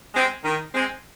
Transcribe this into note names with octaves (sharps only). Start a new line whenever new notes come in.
G#3 C4
D#3
G#3 C4